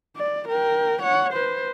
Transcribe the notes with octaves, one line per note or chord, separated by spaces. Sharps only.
D5
A#4 G5
C#5 F#5
B4 C5